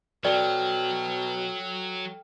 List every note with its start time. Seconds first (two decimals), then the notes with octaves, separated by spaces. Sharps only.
0.25 B2 F#3 A4 D5 G5 F6